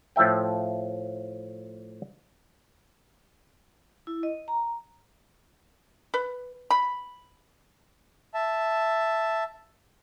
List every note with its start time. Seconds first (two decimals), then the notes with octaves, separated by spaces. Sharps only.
0.16 A2 F3 A4 E5 G5
4.07 E4
4.23 D#5
4.48 A#5
6.14 B4
6.71 B5
8.34 E5 A5